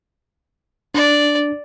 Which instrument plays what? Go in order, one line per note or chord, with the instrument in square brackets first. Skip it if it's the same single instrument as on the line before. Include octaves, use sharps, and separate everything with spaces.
[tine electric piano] D4 [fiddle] D5